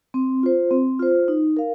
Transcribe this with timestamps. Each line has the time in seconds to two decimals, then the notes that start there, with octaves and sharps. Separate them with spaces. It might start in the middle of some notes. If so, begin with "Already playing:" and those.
0.14 C4
0.43 F4 C5
0.71 C4
0.99 F4 C5
1.28 D#4
1.57 A#4 F5